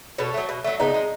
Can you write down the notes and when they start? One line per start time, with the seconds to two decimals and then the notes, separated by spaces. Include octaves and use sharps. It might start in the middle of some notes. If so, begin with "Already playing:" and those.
0.18 B2 A4 C#5
0.34 F#3 A3
0.49 B2
0.64 F#3 A3
0.80 C#3 B3 D#4
0.94 G#3